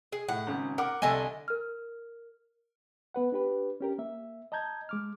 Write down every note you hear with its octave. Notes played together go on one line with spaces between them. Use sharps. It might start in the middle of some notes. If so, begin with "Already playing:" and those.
G#4
A2 F#5
G#1 C#3
A#4 F#5 D6
C2 D3 A4 D#5 G#5 E6
A#4 F6
B3 B4 F#5
D4 G4 B4
C#4 G4 A#4
A#3 E5
D#5 A5 A#5 G6 G#6
G#3 D6 F6